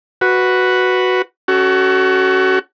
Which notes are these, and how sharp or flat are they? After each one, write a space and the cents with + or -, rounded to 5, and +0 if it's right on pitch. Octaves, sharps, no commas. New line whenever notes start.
F#4 +0 B4 +0 F#5 +0
C#4 +0 F#4 +25 A4 +0